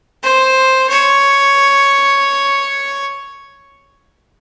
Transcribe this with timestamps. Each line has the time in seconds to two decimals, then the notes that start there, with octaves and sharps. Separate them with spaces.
0.23 C5
0.90 C#5